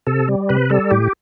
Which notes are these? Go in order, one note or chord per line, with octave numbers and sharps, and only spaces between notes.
C3 A4
G3
C3 B4
G3 A4
A2 G4